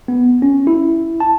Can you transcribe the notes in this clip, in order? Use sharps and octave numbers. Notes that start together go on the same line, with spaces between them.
B3
C#4
E4
A5